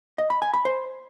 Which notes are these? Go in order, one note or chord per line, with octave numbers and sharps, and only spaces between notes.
D#5
B5
G#5
B5
C5